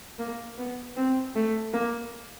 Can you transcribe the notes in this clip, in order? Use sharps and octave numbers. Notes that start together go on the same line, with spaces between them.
A#3
B3
C4
A3
A#3